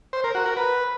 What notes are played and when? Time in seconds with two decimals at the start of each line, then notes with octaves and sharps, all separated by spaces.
0.13 C5
0.24 A#4
0.35 F#4
0.46 A#4
0.57 B4